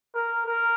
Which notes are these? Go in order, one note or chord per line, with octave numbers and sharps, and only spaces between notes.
A#4
A#4